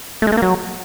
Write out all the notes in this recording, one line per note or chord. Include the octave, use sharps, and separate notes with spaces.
A3
G#3
A3
A#3
F#3